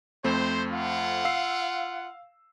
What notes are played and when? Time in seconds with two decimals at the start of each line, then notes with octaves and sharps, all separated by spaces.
0.24 F2 A3 C4 C5
0.71 F4 F#5
1.25 F5 E6 C7